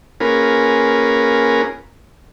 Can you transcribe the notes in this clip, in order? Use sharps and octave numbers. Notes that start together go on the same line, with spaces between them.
A#3 C#4 F4 G#4 A#4 B4